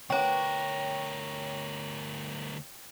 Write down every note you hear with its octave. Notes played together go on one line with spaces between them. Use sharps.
D2 A#4 C#5 G5 C#6 D6